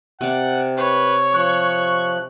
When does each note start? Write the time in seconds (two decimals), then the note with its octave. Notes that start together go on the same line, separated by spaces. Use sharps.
0.21 C3 D5 F#5
0.77 B4 C#5
1.35 F3 C#6 F#6